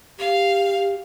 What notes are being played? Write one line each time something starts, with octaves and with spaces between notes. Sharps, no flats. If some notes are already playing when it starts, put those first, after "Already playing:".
G4 F5